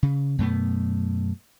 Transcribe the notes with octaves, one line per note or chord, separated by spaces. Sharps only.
C#3
F#2 B2 A3 B3